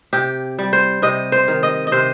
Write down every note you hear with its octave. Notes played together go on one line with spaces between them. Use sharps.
C3 G4
G3
C5
C3 D#5
C5
D#3
D#5
D#5
C3 C5